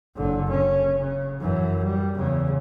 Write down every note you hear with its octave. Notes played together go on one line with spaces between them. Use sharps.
F#1 D3
C#4
C#3
F#2 E3
G3
E2 C#3